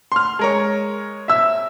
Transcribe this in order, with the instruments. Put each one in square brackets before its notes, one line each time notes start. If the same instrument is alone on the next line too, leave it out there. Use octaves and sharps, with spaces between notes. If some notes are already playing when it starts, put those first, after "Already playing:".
[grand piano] C6 F6
G#3 A#4 C#5
[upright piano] E5 E6